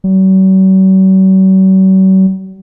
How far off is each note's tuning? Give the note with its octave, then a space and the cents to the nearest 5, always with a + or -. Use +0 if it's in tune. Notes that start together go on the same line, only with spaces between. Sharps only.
F#3 +45